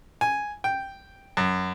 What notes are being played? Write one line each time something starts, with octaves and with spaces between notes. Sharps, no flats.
G#5
G5
F#2